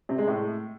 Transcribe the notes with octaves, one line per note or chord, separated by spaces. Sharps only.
C3
G#3
A2